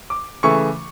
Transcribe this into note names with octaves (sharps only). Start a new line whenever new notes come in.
D6
C#3 E3 A3 C#6